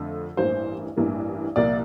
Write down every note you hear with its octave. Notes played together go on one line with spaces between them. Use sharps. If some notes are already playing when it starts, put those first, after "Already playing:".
Already playing: F2 D3 A3
A1 G2 E3 A#3 C5
A1 G2 E3 A#3
C2 A#2 F3 A#3 D5